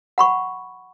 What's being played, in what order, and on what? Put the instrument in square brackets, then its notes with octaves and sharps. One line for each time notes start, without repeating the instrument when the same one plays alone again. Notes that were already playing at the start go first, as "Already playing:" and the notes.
[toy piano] F#5 B5 C#6